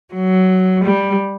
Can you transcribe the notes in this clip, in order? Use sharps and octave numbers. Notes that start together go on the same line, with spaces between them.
F#3
G3